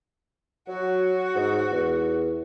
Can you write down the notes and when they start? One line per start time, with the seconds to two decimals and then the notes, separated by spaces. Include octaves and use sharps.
0.68 F#3 F#4
1.35 G#2
1.71 E2